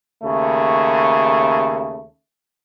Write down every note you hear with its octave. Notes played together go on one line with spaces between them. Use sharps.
D#2 C#3 A3